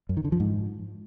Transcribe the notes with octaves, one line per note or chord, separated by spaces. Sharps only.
F#2
D#3
D3
F3
G#2